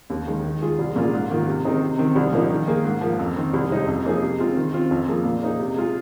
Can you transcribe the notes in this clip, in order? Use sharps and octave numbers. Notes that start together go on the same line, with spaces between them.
D#2
D#3 G#3
D#3
G#3 F4 G#4
C2
A#2 A#3 F4 G#4
G#2
D#3 A#3 F4
C3
D#3 C4 D#4 G#4
C3
D#3 C4
C2
A#2 F3 A#3 D#4
D#3
A#3 G#4
G#2
F3 A#3
F2
D#3 C4
C2
C3 G#3 D#4 G#4
F2
F3 A#3 D#4 G#4
C3
G#3 C4 F4 G#4
D#3
C4 F4
F2
F3 A#3 G#4
A#2
A#3 D#4 G#4
C3
G#3 F4 G#4